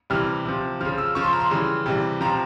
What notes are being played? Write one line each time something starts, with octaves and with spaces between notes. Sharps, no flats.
C3 E3 G3 F6
C3 F3
C#3 F3 F6
E6
C#3 F3 C#6
C6
A#5
C6
C#3 E3 G3
C3 E3 G3
C3 F3 A#5